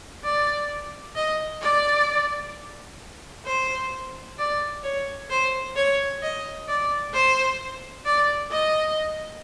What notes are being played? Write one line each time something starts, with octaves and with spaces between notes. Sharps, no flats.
D5
D#5
D5
C5
D5
C#5
C5
C#5
D#5
D5
C5
D5
D#5